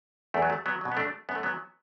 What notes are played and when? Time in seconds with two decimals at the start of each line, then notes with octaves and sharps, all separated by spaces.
0.34 E2 A3
0.42 F#3
0.50 A3
0.66 F#3 B3
0.81 B2 F#3
0.92 B3
0.97 A3 D4
1.29 F#2 B3
1.35 A3
1.43 F#3 B3